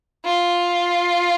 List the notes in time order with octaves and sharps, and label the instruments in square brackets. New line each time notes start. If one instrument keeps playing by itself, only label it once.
[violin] F4